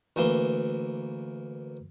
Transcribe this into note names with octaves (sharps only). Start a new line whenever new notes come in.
D2 E3 A#3 E5 C6